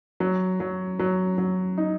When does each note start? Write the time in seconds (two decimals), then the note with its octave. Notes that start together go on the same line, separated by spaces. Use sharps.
0.20 F#3
0.60 F#3
0.99 F#3
1.38 F#3
1.78 D#4